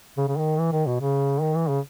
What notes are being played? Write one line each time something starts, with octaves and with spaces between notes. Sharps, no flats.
C#3
C#3
D#3
E3
D#3
B2
C#3
D#3
E3
C#3